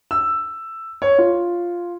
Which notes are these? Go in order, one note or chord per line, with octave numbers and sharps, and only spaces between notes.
E6
C#5
F4